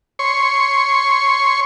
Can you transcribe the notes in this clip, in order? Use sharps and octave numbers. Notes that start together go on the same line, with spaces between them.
C#5 C6 C#6